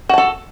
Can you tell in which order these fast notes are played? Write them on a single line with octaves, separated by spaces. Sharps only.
F#4 A5 A4